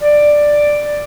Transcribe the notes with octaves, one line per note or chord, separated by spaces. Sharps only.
D5